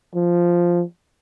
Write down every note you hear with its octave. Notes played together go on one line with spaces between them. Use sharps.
F3